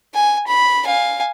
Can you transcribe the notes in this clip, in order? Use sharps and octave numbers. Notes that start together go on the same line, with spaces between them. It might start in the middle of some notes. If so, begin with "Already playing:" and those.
G#5
B5
F5 G#5